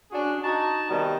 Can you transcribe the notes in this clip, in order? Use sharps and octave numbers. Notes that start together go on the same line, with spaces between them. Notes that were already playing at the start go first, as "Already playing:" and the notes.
C#4 D4 F#4 G#4
D#4 F#4 A5
C3 D#3 G3 B3